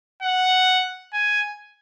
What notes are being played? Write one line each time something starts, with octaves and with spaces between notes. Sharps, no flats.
F#5
G#5